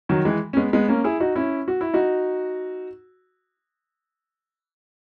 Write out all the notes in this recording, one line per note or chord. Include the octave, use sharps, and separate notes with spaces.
D#3 F#3
E3 G#3
C#4
G#3 B3
G#3 B3
A#3 C#4
E4 G#4
D#4 F#4
C#4 E4
F#4
E4
D#4 F#4